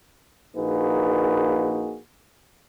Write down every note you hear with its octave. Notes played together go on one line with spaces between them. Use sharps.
A#1 A#3 D#4 F#4 G#4 B4